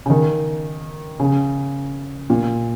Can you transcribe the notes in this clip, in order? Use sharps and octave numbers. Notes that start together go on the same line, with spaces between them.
C#3
D#3
C#3
A#2